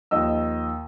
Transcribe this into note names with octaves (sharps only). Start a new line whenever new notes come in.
D#2 F3 D#5 E6